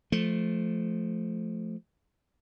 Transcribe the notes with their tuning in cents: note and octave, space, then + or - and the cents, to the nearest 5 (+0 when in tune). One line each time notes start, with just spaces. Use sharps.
F3 +0 A3 -10